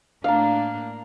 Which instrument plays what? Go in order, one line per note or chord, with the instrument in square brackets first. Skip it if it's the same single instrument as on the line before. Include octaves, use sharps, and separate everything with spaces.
[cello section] A2 A#3 D4 [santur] F5 A#5